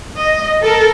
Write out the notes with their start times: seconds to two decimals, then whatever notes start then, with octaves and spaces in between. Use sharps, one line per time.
0.20 D#5
0.63 A4 A#4